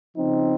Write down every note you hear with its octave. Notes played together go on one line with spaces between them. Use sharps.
C#3 F3 C4 D#4